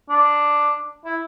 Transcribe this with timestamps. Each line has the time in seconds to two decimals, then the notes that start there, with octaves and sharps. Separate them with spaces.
0.09 D4
1.05 E4